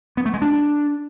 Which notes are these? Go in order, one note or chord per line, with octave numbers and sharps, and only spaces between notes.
B3
A3
G#3
D4